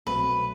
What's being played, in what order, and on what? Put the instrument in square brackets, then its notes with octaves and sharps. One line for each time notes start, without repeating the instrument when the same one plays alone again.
[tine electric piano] C2 B2 F#3 A3 C4 [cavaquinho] B4